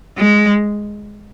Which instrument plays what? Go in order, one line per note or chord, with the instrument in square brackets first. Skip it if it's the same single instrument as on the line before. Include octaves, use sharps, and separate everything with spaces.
[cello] G#3